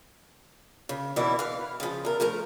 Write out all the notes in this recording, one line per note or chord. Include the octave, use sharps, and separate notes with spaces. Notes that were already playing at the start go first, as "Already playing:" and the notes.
C#3
D#2 B2 E3 A#3 E4 D5
B4 F5
C#3 F3
E2 A#4
F3 A3 A#4 A#5